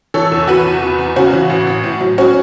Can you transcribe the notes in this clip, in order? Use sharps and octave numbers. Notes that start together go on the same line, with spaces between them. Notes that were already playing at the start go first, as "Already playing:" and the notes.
E3 A4 C#5
E2
E3 F#4 B4
E2
E2
E2
C#3 C#4 F#4
E3
A1
A1
A2
F#3
C#4 F#4